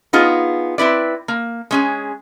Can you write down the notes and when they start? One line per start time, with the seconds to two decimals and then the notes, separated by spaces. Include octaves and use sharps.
0.13 B3 D#4 F4 G#4
0.78 C4 E4 B4 D5
1.28 A#3
1.71 G#3 C#4 G#4